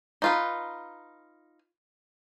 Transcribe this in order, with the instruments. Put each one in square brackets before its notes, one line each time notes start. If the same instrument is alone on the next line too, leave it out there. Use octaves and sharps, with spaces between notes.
[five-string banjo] D#4 F4 B4